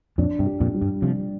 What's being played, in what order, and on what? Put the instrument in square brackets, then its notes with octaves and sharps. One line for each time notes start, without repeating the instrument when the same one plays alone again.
[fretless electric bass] F2 A#2 [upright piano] D4
[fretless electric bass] G2 C3
[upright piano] G4
[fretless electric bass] F2 A#2
[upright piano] G3
[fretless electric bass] G2
[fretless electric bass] C3 F3 [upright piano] G3